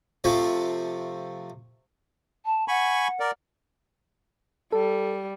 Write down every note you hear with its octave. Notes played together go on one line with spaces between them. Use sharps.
C3 F3 A3
A5
F#5 G#5 B5 C#6
A#4 D5
G3 A4